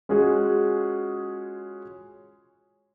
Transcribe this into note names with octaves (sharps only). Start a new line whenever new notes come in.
G#3 C#4 F4 F#4 G#4